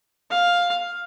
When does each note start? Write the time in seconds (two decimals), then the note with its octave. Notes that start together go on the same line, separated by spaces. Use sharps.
0.31 F5